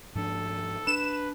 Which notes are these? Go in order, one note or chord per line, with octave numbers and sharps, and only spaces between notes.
G#2 F3 D4 A4
D4 B4 E7